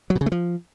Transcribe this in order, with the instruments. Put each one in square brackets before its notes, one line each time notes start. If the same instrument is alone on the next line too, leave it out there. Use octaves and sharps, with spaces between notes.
[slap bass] F#3
B2
C#3
A3
F3